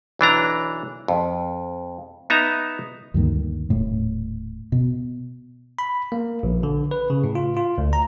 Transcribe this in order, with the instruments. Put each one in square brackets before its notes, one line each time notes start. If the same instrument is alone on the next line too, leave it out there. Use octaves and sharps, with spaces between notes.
[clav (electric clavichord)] B1 E3 D4 A#5
F2
B3 D#4 E5 A#5
[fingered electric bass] D2 G2 D#3 A#3
D#1 A2
B2
[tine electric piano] B5
A#3
A#1
D3
B4
C#3
A2
F4
F4
D2
A#5